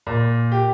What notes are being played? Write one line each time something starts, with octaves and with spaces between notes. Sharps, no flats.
A#2
G4